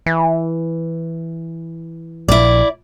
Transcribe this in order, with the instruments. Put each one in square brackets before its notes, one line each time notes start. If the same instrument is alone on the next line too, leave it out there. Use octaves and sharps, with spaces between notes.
[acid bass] E3
[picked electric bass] A#1 [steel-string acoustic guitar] E4 D5